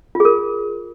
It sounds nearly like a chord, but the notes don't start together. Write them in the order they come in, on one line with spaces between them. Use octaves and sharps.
F4 G#4 A#4